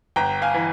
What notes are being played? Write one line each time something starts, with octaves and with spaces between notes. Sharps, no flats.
G1 G5 A#5
F5 G#5
E3